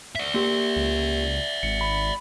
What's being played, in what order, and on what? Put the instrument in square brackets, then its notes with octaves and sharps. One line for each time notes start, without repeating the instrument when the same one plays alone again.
[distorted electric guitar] D5 E5
[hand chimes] A#3 G4
[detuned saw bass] C#2
[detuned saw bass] G#1 [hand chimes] C#7
[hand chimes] B5